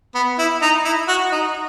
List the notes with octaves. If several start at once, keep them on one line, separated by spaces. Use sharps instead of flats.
B3
E4
D#4
E4
F#4
D#4